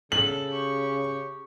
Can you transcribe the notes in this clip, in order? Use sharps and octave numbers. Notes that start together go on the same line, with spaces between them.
C#3 A4 F#7
G4 C#6